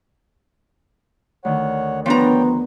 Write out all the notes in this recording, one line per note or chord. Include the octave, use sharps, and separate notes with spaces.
D2 D#3 C#5 F#5
F3 B3 D4 C#5 G5 A#5